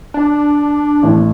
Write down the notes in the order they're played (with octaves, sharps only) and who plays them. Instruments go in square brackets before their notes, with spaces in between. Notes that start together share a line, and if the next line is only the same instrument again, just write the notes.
[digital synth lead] D4
[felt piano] A1